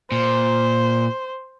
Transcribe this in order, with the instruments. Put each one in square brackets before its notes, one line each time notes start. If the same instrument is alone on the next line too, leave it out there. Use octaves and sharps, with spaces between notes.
[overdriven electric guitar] A#2 [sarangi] C5